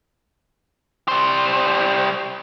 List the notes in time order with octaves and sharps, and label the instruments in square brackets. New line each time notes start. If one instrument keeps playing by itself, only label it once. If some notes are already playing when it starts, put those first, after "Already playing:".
[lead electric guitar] G3 C5